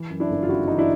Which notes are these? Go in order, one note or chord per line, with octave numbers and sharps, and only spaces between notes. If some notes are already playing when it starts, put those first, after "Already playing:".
Already playing: E3
F#2
D4 E4
G1
F4
C#3 E4 F#4
E3 D#4
D4 E4